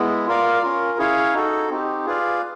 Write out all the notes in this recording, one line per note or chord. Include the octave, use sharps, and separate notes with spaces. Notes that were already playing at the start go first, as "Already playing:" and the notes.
Already playing: G#3 B3 E4
F4 A#4 D5 F5
C#4 F4 A#4
C#4 E4 G#4 C#5 F5
D#4 F#4 A4
C4 D#4 G4
F4 G#4 B4 D5 F5